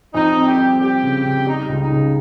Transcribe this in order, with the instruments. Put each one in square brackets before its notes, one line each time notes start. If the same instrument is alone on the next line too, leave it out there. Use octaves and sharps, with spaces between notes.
[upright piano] F2 [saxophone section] D#4
[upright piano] C4
[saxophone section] G4
[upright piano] G3
[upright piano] G3 [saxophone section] G4
[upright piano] C#3
C#3
[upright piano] G3 [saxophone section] D#4
[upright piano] C#2
[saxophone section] D#4
[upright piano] C#3